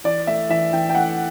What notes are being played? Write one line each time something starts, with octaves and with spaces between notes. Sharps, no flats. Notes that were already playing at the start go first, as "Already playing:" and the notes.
E3 D5
A3 E5
E3 E5
E3 G5
G5
A3 F#5